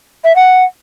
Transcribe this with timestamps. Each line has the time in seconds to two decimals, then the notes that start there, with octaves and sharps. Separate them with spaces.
0.24 E5
0.36 F#5